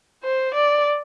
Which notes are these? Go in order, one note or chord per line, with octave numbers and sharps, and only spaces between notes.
C5
D5